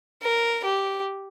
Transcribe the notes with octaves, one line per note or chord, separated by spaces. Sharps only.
A#4
G4